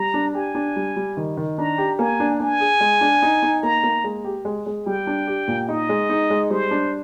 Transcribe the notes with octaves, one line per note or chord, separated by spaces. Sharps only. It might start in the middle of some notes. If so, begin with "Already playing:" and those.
Already playing: G3 A#5
D4
G4 G#5
D4
G3
G3
D#3
D#3
D4 A#5
G4
A#3 G#5
D4
D4 G#5
G#4
G#3
D4
D#4
D#4
A#3 A#5
A#3
G#3
G4
G#3
G#3
G3 G5
D4
G4
A#2
D#4 D#5
G#3
D#4
G#3
G3 C5
D4